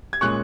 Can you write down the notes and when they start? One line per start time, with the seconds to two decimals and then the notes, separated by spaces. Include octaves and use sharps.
0.13 G#6
0.21 A#2 G#3 C#4 C#6 F#6